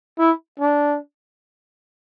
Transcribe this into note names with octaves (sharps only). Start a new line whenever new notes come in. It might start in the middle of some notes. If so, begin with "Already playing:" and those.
E4
D4